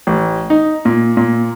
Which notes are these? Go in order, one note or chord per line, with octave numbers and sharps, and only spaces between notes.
A1
D#4
A#2
A#2